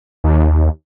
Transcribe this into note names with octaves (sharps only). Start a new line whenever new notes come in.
D#2